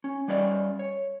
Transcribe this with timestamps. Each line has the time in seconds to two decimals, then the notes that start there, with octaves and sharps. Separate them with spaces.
0.04 C#4
0.28 G3 C#4 B4 D5 D#5
0.79 C#5